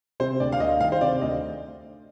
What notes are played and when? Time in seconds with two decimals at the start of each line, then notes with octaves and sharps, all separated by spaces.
0.20 C3 C5
0.40 D2 D5
0.52 F5
0.60 D2 D#5
0.81 D#3 F5
0.92 C5
1.01 C3 D5
1.21 D2 D#5